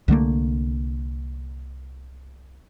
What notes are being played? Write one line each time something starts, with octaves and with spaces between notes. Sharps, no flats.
C2 D3 A3 A#3